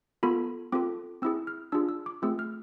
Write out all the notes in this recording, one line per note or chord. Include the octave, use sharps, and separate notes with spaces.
B3 F4 A4 B5
C4 F4 A4 D6
C4 E4 G#4 E6
F6
D4 F4 G#4 E6
E6
D6
A3 C4 F4 G#4 E6
F6